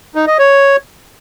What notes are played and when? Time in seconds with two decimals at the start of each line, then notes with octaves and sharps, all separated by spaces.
0.15 D#4
0.27 D#5
0.39 C#5